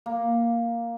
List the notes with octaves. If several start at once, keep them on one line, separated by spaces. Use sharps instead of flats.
A#3